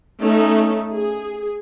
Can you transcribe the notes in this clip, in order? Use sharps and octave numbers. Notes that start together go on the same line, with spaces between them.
A3 C#4 D#4
G#4